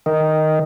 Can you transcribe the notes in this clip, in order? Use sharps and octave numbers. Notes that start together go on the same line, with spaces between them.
D#3